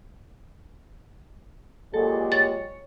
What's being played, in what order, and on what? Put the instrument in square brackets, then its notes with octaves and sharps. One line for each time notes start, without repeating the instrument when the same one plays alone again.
[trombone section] A#2 F#3 G4 [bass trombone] G#3 [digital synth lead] A4
[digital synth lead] C#5 [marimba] A6